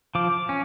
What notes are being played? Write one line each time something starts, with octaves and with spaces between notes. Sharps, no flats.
F3 D6
C#4